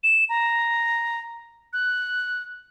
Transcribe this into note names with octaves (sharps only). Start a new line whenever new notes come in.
E7
A#5
F#6